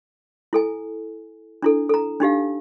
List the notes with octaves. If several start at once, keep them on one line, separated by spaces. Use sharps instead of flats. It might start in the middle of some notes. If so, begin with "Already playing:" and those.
E4 A4 G#5
D4 E4 A4
A4 A#5
D4 D#4 G4 F5